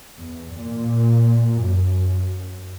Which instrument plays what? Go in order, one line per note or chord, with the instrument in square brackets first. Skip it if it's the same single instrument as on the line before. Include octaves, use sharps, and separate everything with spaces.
[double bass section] E2
A#2
F#2